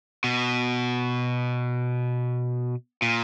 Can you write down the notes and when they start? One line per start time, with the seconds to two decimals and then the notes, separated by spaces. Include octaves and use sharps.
0.24 B2
3.02 A#2